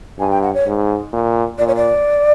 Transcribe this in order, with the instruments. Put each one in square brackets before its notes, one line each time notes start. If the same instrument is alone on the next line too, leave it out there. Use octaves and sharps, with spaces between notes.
[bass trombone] G2 [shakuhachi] G#5
[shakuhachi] G5
F#5
C#5
[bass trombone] G#2
A#2
[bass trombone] A#2 [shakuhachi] D5
[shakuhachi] C#5
D5